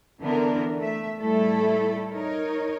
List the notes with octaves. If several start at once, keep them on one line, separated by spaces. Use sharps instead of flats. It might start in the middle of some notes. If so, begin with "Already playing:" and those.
D3 E3 B3 D4 A#4
A3 E5
A2 G3 A3 E4 A4
D#4 A#4 C#5